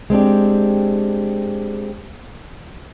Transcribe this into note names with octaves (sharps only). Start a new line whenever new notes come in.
G#3 C4 D4 G4